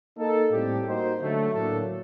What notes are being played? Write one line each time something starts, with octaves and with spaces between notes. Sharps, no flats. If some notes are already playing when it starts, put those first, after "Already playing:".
A#3 D#4 A4
A2 G3 C4 G4
A#3 D#4 F#4 C5
D3 F#3 A3
A2 F#3 A#3 D4 A4